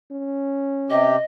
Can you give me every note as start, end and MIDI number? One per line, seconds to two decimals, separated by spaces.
0.12 1.18 61
0.90 1.16 48
0.90 1.16 67
0.90 1.24 75